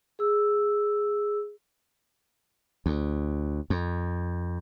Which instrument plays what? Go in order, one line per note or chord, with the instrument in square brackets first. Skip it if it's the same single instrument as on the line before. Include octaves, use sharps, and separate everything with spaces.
[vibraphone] G#4 E6
[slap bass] D2
F2